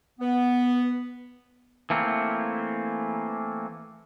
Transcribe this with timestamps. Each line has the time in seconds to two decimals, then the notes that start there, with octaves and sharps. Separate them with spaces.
0.19 B3
1.90 E3 A3 A#3 C4